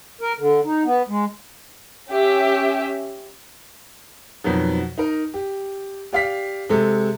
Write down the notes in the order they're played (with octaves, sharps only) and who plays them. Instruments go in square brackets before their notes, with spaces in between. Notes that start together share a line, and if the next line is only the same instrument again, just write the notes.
[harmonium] A#4
D3
D#4
B3
G#3
[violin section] C#4 G4 E5
[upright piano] F2 B2 D#3 F#3
D#4 A#4
G4
G4 D5 F5 F6 B6
C3 G#3 A4